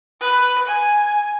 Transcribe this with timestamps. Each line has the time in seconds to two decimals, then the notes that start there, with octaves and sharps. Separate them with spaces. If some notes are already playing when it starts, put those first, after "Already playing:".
0.21 B4
0.67 G#5